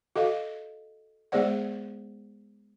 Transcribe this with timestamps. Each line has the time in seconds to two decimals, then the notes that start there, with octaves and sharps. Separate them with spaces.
0.16 F#4 A4 D#5 F5
1.32 G#3 B3 G#4 C5 D5 F#5